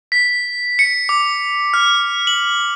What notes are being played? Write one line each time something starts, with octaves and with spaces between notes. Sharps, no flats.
B6
C#7
D6
F6
F#7